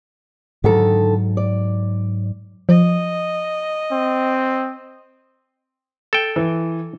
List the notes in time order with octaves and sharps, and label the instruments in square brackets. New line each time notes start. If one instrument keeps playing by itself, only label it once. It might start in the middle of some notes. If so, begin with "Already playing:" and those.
[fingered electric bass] G#2 F#3 [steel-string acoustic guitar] D3 D#3 A4
[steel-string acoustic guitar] D5
[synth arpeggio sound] F3 [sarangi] D#5
[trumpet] C4
[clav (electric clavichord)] A4 G5
[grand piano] E3